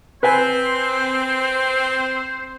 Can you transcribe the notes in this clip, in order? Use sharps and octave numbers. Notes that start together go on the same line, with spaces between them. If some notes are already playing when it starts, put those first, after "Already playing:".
C4 B4 C5 G#5